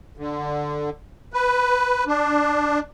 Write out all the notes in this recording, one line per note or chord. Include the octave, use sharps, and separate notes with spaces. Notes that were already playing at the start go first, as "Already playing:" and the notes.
D3
B4
D4